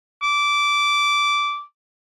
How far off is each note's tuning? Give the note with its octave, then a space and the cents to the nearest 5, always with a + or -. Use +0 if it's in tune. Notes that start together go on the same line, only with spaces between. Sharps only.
D6 -15